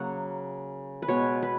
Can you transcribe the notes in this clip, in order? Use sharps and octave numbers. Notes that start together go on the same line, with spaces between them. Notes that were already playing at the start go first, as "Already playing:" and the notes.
Already playing: C#3 F#3 A#3 F#5
B4
B2 G#3 B3 C#5
B4